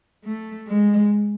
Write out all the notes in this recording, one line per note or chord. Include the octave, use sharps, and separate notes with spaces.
A3
G#3